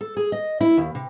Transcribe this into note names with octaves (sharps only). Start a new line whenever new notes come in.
A4
G#4
D#5
E4
D#2
C3